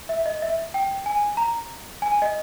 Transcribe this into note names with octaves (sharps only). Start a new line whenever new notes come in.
E5
D#5
E5
G5
G#5
A#5
G#5
D#5